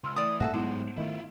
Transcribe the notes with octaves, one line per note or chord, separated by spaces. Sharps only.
C#2 C6 E6 F6
E3 A3 D5 D#6
G2 A#2 A3 F#4 G#4 A4 E5
G#2 F#3 G#3 B3 E4 C5 F#5
D#3 A3 E4 F4 D#5